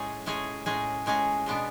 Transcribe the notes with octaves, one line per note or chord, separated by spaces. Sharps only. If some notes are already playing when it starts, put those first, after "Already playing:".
Already playing: A2 G#3 C#4 G#4
A2 G#3 C#4 G#4
A2 G#3 C#4 G#4
A2 G#3 C#4 G#4
B2 G#3 B3 D4